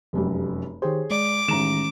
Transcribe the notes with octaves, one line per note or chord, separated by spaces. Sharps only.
F1 F#2 G3
D#3 G4 G#4 C5 C#5
G#3 D5 D6
A1 D#3 G#3 A#5 E7